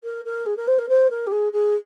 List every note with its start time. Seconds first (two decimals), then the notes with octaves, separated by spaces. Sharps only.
0.04 A#4
0.25 A#4
0.46 G#4
0.56 A#4
0.67 C5
0.78 A#4
0.89 C5
1.10 A#4
1.27 G4
1.31 G#4
1.52 G#4